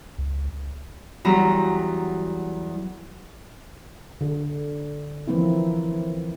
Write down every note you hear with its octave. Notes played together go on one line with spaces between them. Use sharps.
C#2
E2 F#3 G3 A#5
D3
E3 F3 A#3 C4 E4